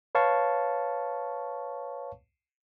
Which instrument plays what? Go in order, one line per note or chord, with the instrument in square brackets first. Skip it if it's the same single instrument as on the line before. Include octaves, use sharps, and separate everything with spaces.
[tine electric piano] B4 C#5 F5 A5 C#6